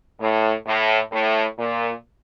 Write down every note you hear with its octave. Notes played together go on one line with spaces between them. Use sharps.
A2
A2
A2
A#2